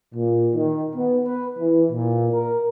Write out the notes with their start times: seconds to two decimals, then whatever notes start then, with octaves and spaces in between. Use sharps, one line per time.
0.14 A#2
0.54 D#3
0.94 B3
1.25 B4
1.59 E3
1.91 A#2
2.32 A#4